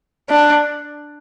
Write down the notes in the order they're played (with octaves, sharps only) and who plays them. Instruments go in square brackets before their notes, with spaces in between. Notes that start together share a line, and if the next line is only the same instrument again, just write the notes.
[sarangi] D4